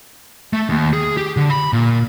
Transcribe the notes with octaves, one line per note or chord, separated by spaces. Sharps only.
A3
D#2
G#4
G4
D3
B5
A#2